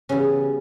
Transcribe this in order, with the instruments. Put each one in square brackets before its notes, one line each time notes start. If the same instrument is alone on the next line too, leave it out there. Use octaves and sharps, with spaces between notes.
[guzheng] C#3 E3 G3 B3 C#4